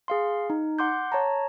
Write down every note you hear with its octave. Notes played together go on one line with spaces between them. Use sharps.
G#4 F5 C6
D#4
F#5 C6 D6 G6
C#5 A5 A#5